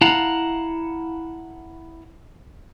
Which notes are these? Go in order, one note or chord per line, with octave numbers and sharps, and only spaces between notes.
E4 F5 F#5 A5 A#5